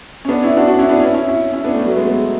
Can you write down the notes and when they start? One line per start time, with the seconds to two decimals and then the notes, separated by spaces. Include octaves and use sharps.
0.25 C#4
0.28 B3 D4
0.43 C#4 E4
0.57 D4 F#4
0.68 D4 F#4
0.79 C#4 E4
0.89 B3 D4
1.00 C#4 E4
1.14 C#4 E4
1.28 C#4 E4
1.53 C#4 E4
1.64 B3 D4
1.75 A3 C#4
1.85 F#3 A3
1.96 G#3 B3
2.07 G#3 B3